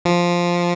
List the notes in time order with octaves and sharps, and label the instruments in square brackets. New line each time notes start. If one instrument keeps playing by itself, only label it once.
[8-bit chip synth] F3